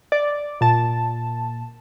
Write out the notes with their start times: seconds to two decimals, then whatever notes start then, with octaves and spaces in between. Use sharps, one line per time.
0.12 D5
0.61 A#2 A5